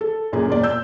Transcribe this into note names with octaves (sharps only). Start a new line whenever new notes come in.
A4
F#2 A#2 G#4
E1 A#2 D5
E6 G6